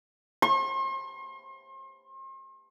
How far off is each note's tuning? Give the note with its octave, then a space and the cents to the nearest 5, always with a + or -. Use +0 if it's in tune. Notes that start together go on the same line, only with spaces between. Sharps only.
C6 +40